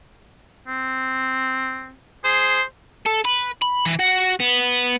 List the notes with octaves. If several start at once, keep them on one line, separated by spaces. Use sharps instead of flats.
C4
G#4 C5
A4
B4
B5
E3
F#4
B3